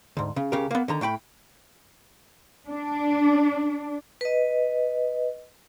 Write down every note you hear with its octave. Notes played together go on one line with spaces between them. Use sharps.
D2 G#2
C#3
C#2 C#3 G4 A#4
A#3 B3
D3 D#3 A#5
A2 A3 G5 B5
D4
B4 D#5